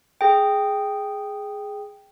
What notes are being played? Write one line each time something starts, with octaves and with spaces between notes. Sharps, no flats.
G#4 G5